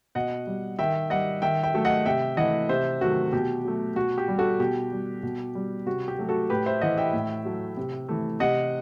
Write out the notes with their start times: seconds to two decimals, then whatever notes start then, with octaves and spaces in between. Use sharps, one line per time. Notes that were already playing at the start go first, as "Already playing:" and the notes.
0.15 B2 D#5 F#5
0.47 G3
0.79 D#3 E5 G5
1.10 G3 D#5 F#5
1.42 D#3 E5 G5
1.63 E5 G5
1.74 F#3 A3
1.85 D#5 F#5
2.06 C3 E5 G5
2.37 E3 A3 D#5 F#5
2.69 C3 C5 E5
3.01 D#3 F#3 A3 F#4
3.33 B2 G4
3.64 F#3 A3
3.96 B2 F#4
4.18 G4
4.28 G3
4.38 F#4 A4
4.60 B2 G4
4.92 G3
5.23 B2
5.55 G3
5.86 C3 F#4
6.08 G4
6.18 F#3 A3
6.29 F#4 A4
6.50 A2 G4 B4
6.66 C5 E5
6.81 E3 A3 D#5 F#5
6.98 E5 G5
7.13 A2
7.45 F#3 A3
7.77 C3
8.09 E3 A3
8.40 C3 D#5 F#5